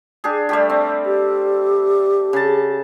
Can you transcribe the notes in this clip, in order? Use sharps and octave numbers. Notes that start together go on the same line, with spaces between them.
D4 G4 G#4
G3 A3 G4
C4
G4
C#3 A5